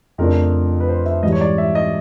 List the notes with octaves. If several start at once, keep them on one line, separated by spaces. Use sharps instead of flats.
F2 C#3 F3 A3 D4 A#4
B4
C5
E5
G#2 E3 G3 D#5
C#5
D5
E5
D#5